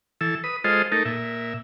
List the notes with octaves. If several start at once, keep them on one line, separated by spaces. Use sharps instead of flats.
E3 A4 E6
B4 D#6
G#3 F4 A4 C5 D#5
A3 D#4 A4 A#4
A#2 E5